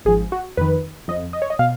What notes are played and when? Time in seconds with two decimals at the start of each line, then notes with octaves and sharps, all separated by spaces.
0.05 G#1 G#2 F3 G#4
0.32 F#4
0.57 F2 D#3 B4
1.08 F2 F3 D#5
1.33 D#5
1.42 C#5
1.50 D#5
1.59 B2 F5